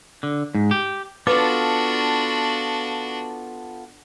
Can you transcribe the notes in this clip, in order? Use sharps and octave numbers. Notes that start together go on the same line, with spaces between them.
D3
G#2
G4
B3 D4 F4 F#4 A4 B4 D6